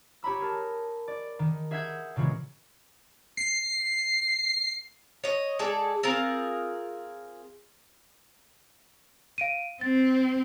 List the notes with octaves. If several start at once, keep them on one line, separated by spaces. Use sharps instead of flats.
G4 C#5 A#5 B5 E6
G#4 A#4 A5
D5
D#3
G#4 E5 F#5 E6 G6 G#6
A#2 C#3 E3 G#3 F#4
C7
C#5 D#5
G#3 G#4 A4 D5
C4 F4 G#4 A#4
F5 D7 D#7
C4 A6